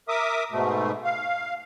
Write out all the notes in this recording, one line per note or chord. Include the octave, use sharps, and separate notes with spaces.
A#4 E5 D6 D#6
G#2 B2 A3
F5